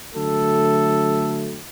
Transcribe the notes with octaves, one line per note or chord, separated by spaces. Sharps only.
D3 F#3 A3 A4